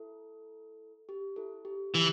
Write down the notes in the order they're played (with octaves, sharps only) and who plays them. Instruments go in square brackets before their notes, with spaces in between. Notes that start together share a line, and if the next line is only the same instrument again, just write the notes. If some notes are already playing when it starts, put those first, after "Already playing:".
Already playing: [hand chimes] E4 A4
G4
E4 A4
G4
[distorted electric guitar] E3 [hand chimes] G4